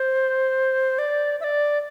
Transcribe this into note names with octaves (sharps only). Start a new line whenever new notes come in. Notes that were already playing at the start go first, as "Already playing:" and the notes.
Already playing: C5
D5
E5
D5